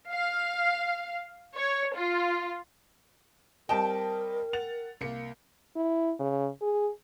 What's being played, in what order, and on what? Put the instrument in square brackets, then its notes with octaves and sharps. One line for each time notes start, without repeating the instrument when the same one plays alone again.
[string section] F5
C#5
F4
[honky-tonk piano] G3 C4 D#5 [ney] A#4 [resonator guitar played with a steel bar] G5 A5
[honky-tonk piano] F#5 A6 F7
C2 A#3 C#7
[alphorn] E4
C#3
G#4